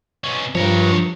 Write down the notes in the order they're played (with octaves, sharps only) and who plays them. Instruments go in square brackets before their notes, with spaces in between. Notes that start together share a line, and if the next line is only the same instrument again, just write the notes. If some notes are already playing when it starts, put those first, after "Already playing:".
[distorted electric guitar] B2 C#4
[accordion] G2 [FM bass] F3 [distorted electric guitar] A#4 C#5